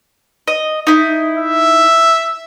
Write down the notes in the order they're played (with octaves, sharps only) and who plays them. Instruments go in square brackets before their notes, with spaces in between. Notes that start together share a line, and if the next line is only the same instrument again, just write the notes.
[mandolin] D#5
D#4 E4
[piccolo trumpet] E5